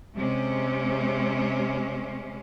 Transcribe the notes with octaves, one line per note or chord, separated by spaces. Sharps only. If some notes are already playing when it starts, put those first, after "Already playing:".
C3 G#3 C#4